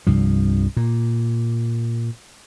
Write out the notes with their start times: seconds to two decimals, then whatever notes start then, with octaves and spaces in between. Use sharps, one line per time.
0.07 C2 G2 F3
0.77 A#2